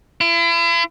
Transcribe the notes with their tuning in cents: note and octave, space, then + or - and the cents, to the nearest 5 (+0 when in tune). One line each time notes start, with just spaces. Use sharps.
E4 +40